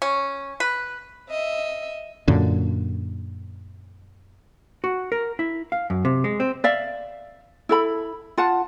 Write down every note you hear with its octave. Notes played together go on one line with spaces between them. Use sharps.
C#4
B4
D#5 E5
F#2 A#2 D3
F#4
A#4
E4
F5
F#2
C3
G#3
C4
D5 E5 F5
E4 A4 B5
F4 F#5 A5